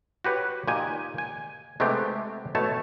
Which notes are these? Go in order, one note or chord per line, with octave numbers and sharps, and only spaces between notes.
F#4 G4 B4 C#5
A#2 D#4 G4 G#5
G#5
C3 G#3 A3 B3 C4 G4
B2 A3 C#5 A5